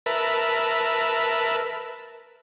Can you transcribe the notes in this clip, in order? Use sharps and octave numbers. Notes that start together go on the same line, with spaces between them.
A#4 B4 E5 A5